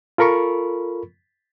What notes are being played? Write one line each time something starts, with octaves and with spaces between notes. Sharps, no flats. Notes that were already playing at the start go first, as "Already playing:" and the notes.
F4 A4 A#4 B5 C#6